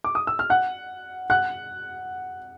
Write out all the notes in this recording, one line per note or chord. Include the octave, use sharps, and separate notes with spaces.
D6
D#6
E6
F6
F#5 F#6
F#5 F#6